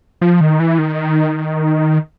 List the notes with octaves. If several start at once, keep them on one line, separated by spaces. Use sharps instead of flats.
F3
D#3
E3
D#3